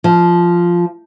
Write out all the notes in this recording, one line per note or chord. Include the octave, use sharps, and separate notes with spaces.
F3